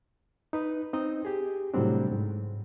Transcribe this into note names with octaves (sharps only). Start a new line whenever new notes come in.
D#4 B4
C4 D#4 D#5
G4 G#4
A2 C3 F#3 G3 C4 D4
G#2